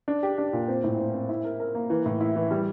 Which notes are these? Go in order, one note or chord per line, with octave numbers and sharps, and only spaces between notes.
D4
G4
D4
A#2
C4
A2
C4
C4
E4
A#4
A#4
A#3
E3
A2
E4
E3
G3